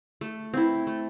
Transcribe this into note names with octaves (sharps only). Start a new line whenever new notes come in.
A3
C4 E4
A3